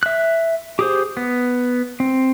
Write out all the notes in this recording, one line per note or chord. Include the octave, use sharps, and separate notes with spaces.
E5 F#6
G4 G#4 C5
B3
C4